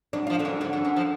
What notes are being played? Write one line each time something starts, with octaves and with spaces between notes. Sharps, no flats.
F#2 D4
F3 F4
D3 D4
F#2
G#2 D3 D4
F#2
F#2
F3